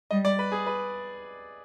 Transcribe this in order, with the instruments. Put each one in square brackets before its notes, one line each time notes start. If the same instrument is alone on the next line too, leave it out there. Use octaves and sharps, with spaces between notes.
[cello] G3 [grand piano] D#5
[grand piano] D5
B4
G#4
B4